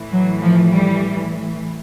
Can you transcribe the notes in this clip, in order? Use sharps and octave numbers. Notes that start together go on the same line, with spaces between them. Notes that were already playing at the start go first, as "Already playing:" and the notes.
Already playing: A2 E3
F#3
F3
G3